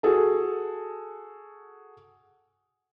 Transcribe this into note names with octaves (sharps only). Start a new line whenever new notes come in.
F#4 G#4 A4